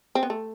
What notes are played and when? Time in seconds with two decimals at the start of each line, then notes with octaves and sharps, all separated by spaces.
0.15 C4
0.23 B3
0.30 A3